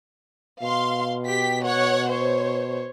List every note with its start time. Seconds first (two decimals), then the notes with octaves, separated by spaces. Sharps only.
0.62 B2 F5 C6
1.25 G4 B6
1.63 C#5 F#5
2.10 C5 C#5